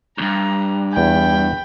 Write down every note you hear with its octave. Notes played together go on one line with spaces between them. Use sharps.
C#2 G2 A#5
E2 G5 G#5 B5